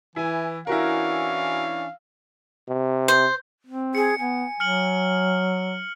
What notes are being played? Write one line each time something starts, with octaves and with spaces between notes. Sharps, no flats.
E3 E4 G#5
E3 C#4 D4 E4 F#4 A#4 F5
C3
C5
C4
G#4 C#7
B3 G#5
F#3 F6 C#7 F#7